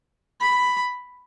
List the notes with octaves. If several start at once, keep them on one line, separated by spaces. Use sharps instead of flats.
B5